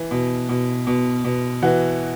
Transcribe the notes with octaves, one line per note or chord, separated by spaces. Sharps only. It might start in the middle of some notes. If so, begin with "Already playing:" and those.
Already playing: E3
B2
B2
B2
B2
E3 F#4